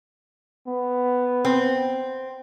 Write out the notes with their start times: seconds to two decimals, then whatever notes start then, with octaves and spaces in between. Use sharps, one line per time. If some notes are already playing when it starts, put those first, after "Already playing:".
0.67 B3
1.45 C4